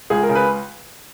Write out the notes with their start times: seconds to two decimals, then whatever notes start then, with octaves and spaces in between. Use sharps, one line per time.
0.10 C#2 G#4
0.23 A#4
0.29 C#3
0.35 B4